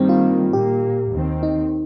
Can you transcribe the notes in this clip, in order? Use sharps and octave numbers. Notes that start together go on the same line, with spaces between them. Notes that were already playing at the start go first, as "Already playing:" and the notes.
Already playing: G2 D#3 G3 A#3 C4
F4
A#2 A#3 G4
D#2 D#3 C4
D#4